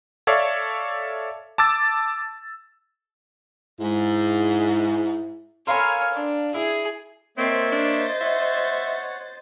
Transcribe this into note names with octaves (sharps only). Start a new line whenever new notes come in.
A4 C#5 D5 E5 F5
A5 D6 E6 A6
G#2 E4
A4 A#4 C#5 F5 G#5 B5 C6
D4
E4 G#4
A#3 C4 C5 C#5 D#5 E5 A6
D4
C#5 E5 F#5